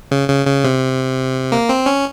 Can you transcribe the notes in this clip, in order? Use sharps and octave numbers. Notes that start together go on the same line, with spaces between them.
C#3
C#3
C#3
C3
A#3
C4
C#4